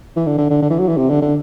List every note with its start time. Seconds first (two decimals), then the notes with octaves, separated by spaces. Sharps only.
0.16 E3
0.27 D3
0.38 D3
0.50 D3
0.62 D3
0.70 E3
0.79 F#3
0.88 E3
0.97 C3
1.09 D3
1.22 D3